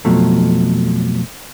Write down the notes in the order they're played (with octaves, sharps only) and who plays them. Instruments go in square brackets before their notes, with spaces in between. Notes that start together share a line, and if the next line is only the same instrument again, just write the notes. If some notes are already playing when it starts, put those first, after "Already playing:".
[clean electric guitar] F2 B2 F3 F#3 A3